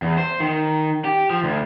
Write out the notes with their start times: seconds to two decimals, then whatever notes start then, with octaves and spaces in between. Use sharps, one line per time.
0.02 E2
0.18 C5
0.40 D#3
1.05 G4
1.30 F3
1.43 D2